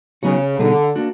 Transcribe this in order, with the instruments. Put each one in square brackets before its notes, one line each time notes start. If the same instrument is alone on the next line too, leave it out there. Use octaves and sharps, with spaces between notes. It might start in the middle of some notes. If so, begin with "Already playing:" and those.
[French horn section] C#3 [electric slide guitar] F#3 B3 D#4 F#4
[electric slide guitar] B2 G3 B3 D#4 G#4 [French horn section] D3
[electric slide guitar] A#3 D4 F#4